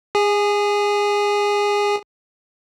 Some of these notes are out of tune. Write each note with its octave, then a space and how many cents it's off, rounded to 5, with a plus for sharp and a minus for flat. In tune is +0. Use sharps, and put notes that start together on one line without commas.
G#4 -25 G#5 +0